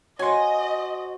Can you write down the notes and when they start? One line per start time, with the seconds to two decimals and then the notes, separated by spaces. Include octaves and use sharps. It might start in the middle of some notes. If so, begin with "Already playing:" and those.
0.19 F#4 C5 C#5 D#5 G#5 C6